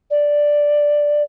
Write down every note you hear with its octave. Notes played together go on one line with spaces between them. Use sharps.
D5